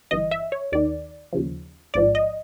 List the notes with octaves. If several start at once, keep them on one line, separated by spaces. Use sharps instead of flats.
G1 G2 E3 D#5
E5
C#5
D#2 D#3 D5
D#2 C#3 F3
A1 G#2 F3 D5
D#5